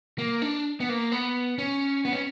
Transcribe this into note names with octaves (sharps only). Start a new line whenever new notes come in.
A#3
D4
B3
A#3
B3
C#4
B3
C#4